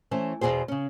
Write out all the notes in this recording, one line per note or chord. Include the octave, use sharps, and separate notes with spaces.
E3 A3 C#4 C5
E2 G#2 B2 G#4 C5
C#3 C#4